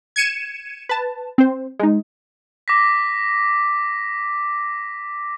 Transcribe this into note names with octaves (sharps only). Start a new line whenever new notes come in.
G#6 C#7 D#7 E7
B4 A5
C4 C5
G#3 D#4
D6 A#6 B6